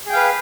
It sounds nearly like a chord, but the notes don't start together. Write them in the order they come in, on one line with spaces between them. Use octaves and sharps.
G#4 G5 F5 B4